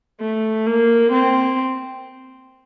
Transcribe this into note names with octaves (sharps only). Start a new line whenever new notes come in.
A3
A#3
C4